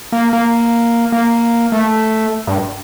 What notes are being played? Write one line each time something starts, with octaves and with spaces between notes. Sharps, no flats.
A#3
A#3
A#3
A3
G2